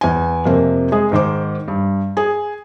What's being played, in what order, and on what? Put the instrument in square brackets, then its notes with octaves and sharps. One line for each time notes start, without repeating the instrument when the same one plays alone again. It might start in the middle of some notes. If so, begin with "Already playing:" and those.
[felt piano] E2 G#5
F2 C3 A#3
G#3 G#4
G#2 D#3 C5 D6
G2
G#4